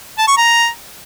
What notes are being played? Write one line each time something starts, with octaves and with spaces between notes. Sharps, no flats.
A5
C#6
A#5